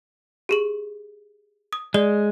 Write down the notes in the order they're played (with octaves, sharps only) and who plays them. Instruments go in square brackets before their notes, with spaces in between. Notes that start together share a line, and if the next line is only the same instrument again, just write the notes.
[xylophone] G4 G#4 F#7
D#6
[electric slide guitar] G#3 [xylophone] D5 G7